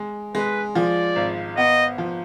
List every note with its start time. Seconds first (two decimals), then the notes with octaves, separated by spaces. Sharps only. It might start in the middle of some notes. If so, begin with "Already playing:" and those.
Already playing: G#3
0.35 G#3 B4
0.75 F3 D5
1.16 G#1
1.57 B3 D#5
1.98 F3